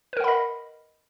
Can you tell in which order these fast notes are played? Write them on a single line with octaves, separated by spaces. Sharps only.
B4 A#4 F#5 B5 D#5